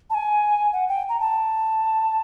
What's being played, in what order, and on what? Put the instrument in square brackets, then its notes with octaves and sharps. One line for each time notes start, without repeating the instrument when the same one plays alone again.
[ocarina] A5
G#5
F#5
G5
A#5
A5